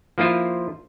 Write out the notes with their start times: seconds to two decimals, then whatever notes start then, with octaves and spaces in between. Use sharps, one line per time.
0.18 F3 A#3 E4 F4 C5